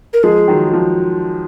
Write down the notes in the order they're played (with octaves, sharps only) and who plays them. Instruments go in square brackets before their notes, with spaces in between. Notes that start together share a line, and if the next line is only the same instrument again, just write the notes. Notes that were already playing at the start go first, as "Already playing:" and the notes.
[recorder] A#4
[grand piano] F3 G#3 [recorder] G#4
[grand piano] D#3 F#3
F3